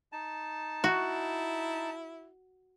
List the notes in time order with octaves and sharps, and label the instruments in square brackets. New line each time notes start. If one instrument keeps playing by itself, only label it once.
[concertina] D#4 A5
[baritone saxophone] E4 [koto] F#4